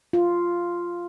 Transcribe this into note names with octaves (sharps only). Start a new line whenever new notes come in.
F4